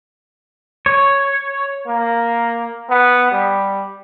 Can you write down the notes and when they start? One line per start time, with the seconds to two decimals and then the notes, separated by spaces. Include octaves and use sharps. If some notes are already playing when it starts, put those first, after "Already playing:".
0.86 C#5
1.87 A#3
2.89 B3
3.32 G3